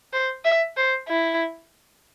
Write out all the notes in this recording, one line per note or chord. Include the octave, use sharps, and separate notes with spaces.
C5
E5
C5
E4